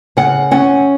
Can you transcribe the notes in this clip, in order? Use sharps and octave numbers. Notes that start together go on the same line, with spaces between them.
C#3 F#5
C#4 F#5